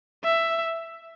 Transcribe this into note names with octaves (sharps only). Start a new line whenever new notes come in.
E5